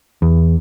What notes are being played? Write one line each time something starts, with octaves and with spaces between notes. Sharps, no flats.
E2